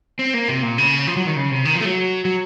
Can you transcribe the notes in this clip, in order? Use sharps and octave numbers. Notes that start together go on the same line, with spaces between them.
C4
A#3
C3
A#2
C#3
F3
F#3
D#3
C#3
C3
D#3
F3
A3
F#3
F#3